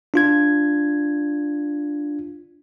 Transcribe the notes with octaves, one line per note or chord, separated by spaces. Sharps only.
D4 F4 G#6